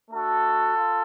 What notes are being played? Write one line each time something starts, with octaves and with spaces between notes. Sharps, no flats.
A3 D4 F#4 A4
F4